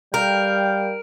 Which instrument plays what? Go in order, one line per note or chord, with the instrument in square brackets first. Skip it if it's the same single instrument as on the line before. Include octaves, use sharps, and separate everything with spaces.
[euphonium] G3 [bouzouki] A#4 [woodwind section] F5 G5